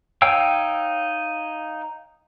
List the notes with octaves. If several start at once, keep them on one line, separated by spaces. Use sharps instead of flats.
D#4 C#5 F5 G5 E6